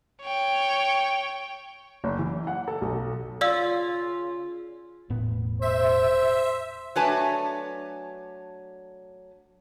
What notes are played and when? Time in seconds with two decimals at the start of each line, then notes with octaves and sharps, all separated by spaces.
0.22 C#5 G5
2.04 F#1
2.19 E3
2.47 F#5
2.68 A4
2.81 B1
3.41 C#3 F4 D5 F5 E6
5.10 E1 A2 B3
5.62 C5 E5
6.96 F#3 A3 D4 B4 G#5 A5